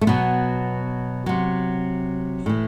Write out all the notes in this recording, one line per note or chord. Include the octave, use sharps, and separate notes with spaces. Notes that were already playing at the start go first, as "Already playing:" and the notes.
A3
B2 F#3 B3
C3 F#3
A2 E3